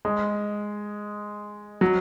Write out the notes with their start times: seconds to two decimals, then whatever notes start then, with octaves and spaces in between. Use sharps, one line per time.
0.05 G#3
1.81 F#3